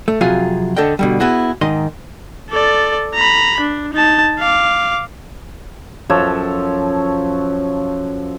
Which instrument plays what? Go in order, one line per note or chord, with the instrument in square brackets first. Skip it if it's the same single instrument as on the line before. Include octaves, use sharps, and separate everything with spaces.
[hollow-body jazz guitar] A3
F2 C3 F#3 F4 G#4 F5
D3 A4 D#5 F#5 G5
B2 D3 G3
B3 E4 F#4 G#4
G#2 D#3 D#5 C6
[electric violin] A4 D5
A#5 B5
D4
D#4 A5
F5 D6
[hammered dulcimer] F#2 F3 A4 C#5